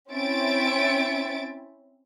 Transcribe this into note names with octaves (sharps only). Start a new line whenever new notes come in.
C4 C#4 E4 E5 A6 D7